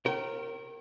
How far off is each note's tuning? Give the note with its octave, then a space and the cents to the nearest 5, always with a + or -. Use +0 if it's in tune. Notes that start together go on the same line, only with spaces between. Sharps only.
A#4 -10 C#5 -40 G5 -35